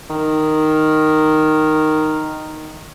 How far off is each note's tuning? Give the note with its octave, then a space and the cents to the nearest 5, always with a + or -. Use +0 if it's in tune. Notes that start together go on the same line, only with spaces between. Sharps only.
D#3 -5